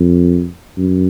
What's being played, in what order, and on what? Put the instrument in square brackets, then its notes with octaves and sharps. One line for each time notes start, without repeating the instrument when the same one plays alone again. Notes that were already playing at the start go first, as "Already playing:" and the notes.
Already playing: [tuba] F2
F#2